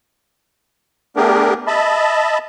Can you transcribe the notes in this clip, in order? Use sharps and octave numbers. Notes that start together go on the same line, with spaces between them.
A3 B3 D4 G4 G#4 A#4
D#5 E5 A5 B5